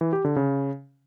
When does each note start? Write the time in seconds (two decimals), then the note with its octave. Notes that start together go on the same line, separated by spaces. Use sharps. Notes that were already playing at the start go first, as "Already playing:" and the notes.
0.01 E3
0.13 G4
0.25 D3
0.36 C#3